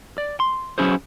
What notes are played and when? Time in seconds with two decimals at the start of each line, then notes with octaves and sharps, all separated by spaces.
0.18 D5
0.40 C6
0.78 F#3 B3 C#4 E4 G#4 C5